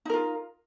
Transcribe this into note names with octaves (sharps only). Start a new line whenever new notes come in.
D#4 F4 A#4